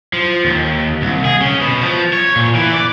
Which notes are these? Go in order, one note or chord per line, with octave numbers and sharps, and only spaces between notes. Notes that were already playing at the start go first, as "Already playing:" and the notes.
F3
D#2
C2
G#4
C#3
B2
F3
C#5
A#2
E3
D5